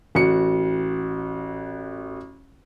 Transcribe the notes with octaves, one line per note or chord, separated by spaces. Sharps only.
A1 F#4 C#7